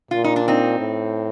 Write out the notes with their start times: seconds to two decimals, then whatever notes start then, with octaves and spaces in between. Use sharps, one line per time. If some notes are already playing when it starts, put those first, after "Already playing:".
0.11 A#2 F4
0.24 D#4
0.36 D4
0.48 C4 D#4
0.79 A2